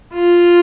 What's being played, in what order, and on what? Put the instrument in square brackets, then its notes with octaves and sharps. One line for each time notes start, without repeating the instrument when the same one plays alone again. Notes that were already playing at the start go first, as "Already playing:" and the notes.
[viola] F4